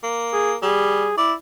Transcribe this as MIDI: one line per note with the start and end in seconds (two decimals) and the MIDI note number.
0.03 0.57 58
0.33 0.52 68
0.63 1.08 55
0.63 1.14 68
1.18 1.34 64
1.18 1.33 74